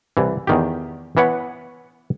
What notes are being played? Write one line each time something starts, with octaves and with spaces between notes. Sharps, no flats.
C2 E3
E2 D#3 G4
E3 B3 B4 C#5 F#5